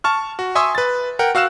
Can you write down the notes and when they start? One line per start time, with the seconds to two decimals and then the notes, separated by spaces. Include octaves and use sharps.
0.04 A5 C#6 F6
0.39 F#4
0.55 E5 G#5 C6 C#6 D#6 E6
0.75 B4 A6
1.19 A#4 F#5 G5
1.35 F#4 F5 E6 F#6 E7